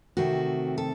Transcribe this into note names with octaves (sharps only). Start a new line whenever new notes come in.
C3 D#3 A3 C4 F#4
A4